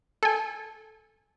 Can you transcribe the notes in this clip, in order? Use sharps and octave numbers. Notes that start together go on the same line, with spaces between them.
A4 G#5